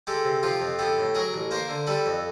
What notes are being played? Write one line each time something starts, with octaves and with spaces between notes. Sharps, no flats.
G#3 G4 A4
C3
F3 F4 G4
F2
B3 G4 A4
A2
F#3 G#4 A#4
A1
A#3 A#4 C5
D3
G3 A4 B4
F2